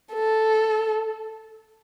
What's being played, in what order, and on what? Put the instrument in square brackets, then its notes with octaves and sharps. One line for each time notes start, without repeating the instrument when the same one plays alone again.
[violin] A4